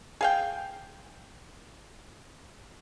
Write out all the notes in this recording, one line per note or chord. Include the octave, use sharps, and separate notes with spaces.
G#4 F5 G5